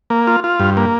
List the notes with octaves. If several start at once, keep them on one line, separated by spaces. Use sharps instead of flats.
A#3
F4
F4
G2
A#3